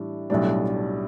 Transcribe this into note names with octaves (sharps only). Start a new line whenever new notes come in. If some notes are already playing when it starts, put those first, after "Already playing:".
Already playing: A2 E3 G3 D4
B1 A2 G3 D4